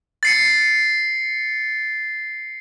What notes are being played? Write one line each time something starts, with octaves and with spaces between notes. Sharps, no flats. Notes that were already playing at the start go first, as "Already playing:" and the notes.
A6 C7 C#7